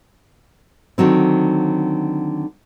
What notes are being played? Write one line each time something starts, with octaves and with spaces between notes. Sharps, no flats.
D3 D#3 F#3 C4